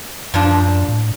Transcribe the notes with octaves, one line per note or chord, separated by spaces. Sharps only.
F#2 A#2 F3 D4
A2